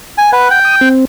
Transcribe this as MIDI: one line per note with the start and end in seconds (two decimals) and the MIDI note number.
0.18 0.30 80
0.33 0.48 71
0.33 0.59 78
0.51 0.89 79
0.65 0.76 87
0.81 1.05 60